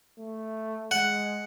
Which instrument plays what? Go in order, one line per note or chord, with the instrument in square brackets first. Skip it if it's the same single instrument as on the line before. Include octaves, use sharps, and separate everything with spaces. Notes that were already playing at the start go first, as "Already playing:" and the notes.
[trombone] A3
[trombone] G#3 [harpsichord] F#5